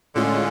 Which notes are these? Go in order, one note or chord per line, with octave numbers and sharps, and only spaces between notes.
A2 D3 G#3 C#4 F4